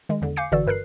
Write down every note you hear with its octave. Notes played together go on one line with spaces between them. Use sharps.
D#3 G#3
E2 D3
F5 G#5 D6 G6 C7 C#7
G1 D3 E3 F#4 D5 E6
G2 A#4 B4 F#6 C7